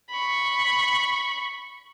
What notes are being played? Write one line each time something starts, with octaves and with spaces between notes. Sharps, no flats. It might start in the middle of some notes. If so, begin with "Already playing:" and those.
B5 C#6